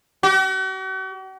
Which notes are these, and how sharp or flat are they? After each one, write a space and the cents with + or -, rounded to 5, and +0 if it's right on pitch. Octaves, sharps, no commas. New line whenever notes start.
F#4 +45